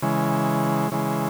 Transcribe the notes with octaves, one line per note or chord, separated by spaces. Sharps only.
C#3 E3 G#3
C#3 E3 G#3